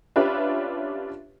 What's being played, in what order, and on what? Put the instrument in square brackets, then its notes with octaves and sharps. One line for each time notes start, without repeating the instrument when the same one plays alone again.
[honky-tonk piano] C#4 D4 F4 G4 B4 E5